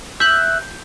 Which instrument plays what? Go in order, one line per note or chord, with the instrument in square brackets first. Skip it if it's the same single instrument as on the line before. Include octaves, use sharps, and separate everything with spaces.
[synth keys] E5 F#6 [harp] G6